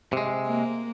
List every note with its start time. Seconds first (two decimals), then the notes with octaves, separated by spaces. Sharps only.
0.13 C3 G#3
0.46 A#3